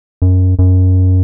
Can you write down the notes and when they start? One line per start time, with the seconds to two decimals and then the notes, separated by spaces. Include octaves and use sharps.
0.22 F#2
0.59 F#2